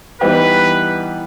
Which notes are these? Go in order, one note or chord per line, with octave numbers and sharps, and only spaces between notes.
E3 G3 B3 D#4 G4 B4